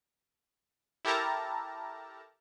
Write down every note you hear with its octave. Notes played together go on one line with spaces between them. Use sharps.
E4 G4 A4 A#4 A5 A#5